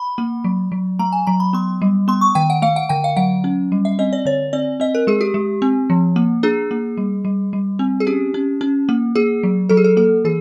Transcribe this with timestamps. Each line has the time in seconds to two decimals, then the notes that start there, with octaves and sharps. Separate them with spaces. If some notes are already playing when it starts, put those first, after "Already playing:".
Already playing: B5
0.18 A#3
0.44 F#3
0.72 F#3
0.99 A3 A#5
1.12 G#5
1.27 F#3 A#5
1.40 B5
1.53 B3 C6
1.82 G3
2.08 B3 C6
2.21 C#6
2.35 D#3 G5
2.50 F#5
2.62 A3 F5
2.76 F#5
2.89 D3 G5
3.04 F5
3.17 F#3 F#5
3.44 C#4
3.72 G3
3.85 E5
3.99 C4 D#5
4.13 D5
4.25 D3 C#5
4.53 C4 D5
4.80 C4 D#5
4.95 A#4
5.07 G#3 G#4
5.21 G4
5.34 G#3
5.62 C4
5.90 F3
6.16 A#3
6.43 D4 G#4
6.71 A#3
6.97 G3
7.25 G3
7.53 G3
7.79 C4
8.00 G#4
8.07 C#4 G4
8.34 C#4
8.61 C#4
8.89 A#3
9.15 A#3 G#4
9.43 F#3
9.69 F#3 A4
9.77 G#4
9.84 A4
9.97 A#3 A4
10.25 E3 G#4